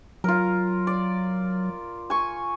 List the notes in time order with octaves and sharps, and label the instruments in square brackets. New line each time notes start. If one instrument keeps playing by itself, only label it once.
[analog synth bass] F#3 [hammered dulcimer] F4 A#4
[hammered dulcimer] D5
G#5 C#6